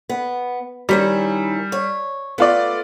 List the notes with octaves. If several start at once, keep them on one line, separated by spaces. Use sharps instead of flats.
B3
D#3 G3 C#4 E4
C#5
A3 B3 F4 D5